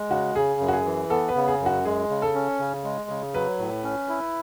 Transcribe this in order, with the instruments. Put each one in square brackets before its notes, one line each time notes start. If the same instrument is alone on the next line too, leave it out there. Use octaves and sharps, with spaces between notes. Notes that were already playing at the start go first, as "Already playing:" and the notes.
Already playing: [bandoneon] G#3
[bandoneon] C#3 [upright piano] F#4
[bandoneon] C#3 [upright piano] G#4
[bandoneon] F#2
[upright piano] F#4
G#4
[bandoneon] E3
[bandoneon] B3 [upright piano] A4
[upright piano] B4
[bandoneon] C#3
[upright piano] G#4
[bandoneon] F#2
[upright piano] F#4
[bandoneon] G#3 [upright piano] G#4
[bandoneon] C#3
[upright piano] A4
[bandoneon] C#4
C#3
G#3
C#3
[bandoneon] F#3 [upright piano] B4
[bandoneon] A2
C#4
E4